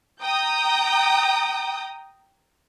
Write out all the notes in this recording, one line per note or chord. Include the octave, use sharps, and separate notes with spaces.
G5 A#5 D#6 G6